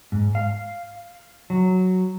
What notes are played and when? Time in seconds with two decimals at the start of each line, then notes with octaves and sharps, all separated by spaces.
0.12 G#2
0.35 F5
1.50 F#3